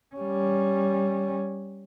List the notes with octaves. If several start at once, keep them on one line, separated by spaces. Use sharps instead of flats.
G3 C#4